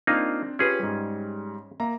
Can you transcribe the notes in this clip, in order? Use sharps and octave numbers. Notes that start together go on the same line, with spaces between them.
A#3 C4 D4 D#4 F4
C#4 F4 G4 G#4 B4
G#2 G3
A#3 E5 A#5